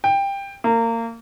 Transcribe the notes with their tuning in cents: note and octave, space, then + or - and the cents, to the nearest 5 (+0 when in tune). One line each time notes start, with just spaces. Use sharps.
G5 +15
A#3 -25